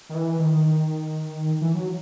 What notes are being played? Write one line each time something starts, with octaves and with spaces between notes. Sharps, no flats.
D#3
E3
D#3
E3
F#3